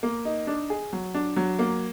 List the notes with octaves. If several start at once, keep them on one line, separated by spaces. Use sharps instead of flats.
A#3
D#4
D4
G#4
F#3
D4
F#3
A#3